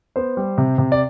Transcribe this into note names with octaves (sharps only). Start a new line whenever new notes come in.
B3 C5
G3
C3
C3
D5